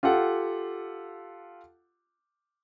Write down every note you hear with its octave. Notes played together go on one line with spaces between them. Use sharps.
F4 G4 A4 F#5